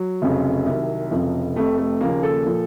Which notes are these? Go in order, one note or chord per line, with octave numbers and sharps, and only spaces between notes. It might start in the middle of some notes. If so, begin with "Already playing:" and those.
Already playing: F#3
F1 F2 C#3
C2 C3 D#3
F1 F2 C#3 F3
F1 F2 C3 A3
A3
D#2 C#3 F3 A#3
A4
A#2 F3